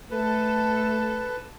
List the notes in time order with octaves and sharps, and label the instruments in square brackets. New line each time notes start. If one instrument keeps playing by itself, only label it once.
[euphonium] A3 [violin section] A4 [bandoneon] B4